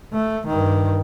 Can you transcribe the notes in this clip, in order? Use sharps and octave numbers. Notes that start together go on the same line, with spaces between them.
A3
G2 D#3